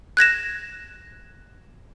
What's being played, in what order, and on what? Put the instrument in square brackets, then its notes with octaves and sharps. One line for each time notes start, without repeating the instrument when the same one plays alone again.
[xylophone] F#6 G#6 A#6 E7